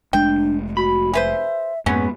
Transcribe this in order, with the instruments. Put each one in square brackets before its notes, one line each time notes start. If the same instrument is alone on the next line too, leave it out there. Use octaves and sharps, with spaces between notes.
[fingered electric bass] F1 G#3 A3 [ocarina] D4 [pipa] G5
[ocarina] F#4 [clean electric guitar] B5
[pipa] G#4 B4 C5 [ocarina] E5
[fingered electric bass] F2 A#3 [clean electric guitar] G#2 B3 [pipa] F#3 C#4